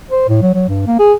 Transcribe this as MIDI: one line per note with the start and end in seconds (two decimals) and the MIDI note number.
0.10 0.24 72
0.29 0.39 45
0.42 0.53 54
0.54 0.65 54
0.68 0.85 43
0.87 0.97 58
0.99 1.13 68